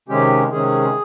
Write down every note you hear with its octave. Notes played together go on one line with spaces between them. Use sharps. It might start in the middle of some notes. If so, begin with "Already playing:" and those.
C3 D#3 G#3 C#4 G4
C3 D#3 G#3 C#4 G#4